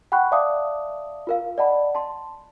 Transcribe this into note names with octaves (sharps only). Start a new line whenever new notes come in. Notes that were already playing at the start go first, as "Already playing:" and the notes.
F#5 G5 B5 C#6 F#6
D5 E5 F5 A5 D6 D#6
F4 A#4 F5
D5 D#5 F#5 A5 B5
A5 C6